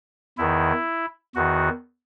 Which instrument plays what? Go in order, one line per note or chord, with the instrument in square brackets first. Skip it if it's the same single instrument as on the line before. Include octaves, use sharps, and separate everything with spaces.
[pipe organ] E2 D#3 E4
E2 D#3 F#4